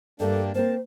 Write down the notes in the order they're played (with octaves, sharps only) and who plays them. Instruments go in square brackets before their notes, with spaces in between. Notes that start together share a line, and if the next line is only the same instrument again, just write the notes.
[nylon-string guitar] G2 A3 [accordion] G3 A#3 D4 [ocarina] A4
[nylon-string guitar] A#3 C4 A#4 [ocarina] C5 [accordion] A5